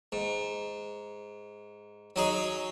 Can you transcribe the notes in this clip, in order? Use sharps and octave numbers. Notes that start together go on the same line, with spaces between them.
G#2
F#3 D#4 G#4